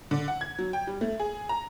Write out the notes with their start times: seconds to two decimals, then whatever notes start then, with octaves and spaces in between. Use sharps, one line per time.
0.11 D3
0.28 F#5
0.41 G#6
0.59 F#3
0.73 G5
0.87 G3
1.01 A3
1.20 G#4
1.49 A#5